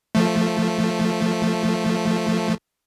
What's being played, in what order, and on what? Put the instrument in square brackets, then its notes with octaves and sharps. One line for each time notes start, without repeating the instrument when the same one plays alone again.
[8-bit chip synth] F3 A3